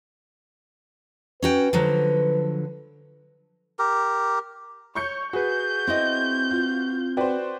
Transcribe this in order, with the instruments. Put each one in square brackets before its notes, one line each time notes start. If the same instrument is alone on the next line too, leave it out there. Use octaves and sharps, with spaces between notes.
[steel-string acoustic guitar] C#4 F#4 G5 [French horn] B4
[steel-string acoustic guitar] D3 F3 F#3
[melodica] G4 A#4
[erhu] C#5 [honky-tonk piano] C#6 G6 C#7
[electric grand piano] F#4 B4 [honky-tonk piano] G#4 [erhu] G6
[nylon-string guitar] C4 E4 D#5
[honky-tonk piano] F4
[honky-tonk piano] F#4 C5 [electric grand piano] B4 D5 G5